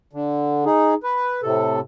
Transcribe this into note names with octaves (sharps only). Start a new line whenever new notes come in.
D3
D#4 G#4
B4
A2 C3 A4